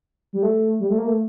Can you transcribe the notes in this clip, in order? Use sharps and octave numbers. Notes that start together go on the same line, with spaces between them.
G3
A3
G3
A3
A#3
A3